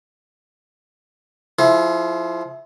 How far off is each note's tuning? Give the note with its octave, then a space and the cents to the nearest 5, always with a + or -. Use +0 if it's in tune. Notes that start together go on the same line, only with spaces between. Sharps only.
F3 +0 E4 +0 G#4 +40